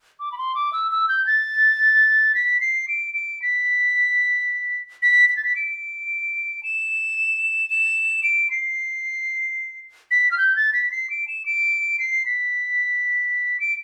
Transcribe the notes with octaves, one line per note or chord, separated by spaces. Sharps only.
D6
B5
C6
D6
E6
E6
G6
A6
B6
C7
D7
D7
B6
B6
B6
A6
B6
D7
E7
E7
D7
C7
B6
F6
G6
A6
B6
C7
D7
E7
D7
C7
B6
D7